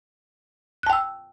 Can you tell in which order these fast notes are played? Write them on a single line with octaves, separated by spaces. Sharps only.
F#6 A5 G5 E6